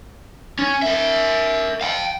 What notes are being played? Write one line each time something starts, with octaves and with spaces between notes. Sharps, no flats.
C#4
A#4 E5
F5 G5